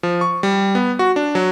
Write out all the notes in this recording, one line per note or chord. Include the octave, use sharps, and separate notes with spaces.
F3
C#6
G3
B3
F#4
D4
F#3